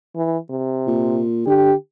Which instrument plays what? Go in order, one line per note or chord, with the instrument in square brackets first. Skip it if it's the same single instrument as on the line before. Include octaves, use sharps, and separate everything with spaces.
[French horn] E3
C3
[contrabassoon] A#2
[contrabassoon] D3 [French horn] G4